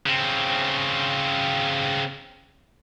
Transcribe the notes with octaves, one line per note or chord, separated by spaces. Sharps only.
C#3 C4